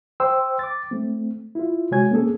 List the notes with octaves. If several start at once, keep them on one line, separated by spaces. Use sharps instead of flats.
C5 G5 C6 E6
D6 A6
A3 C4
E4 F4
C3 G#3 F#4 C#5 G#5 G#6
A#3 C4 C#4 G#4 A4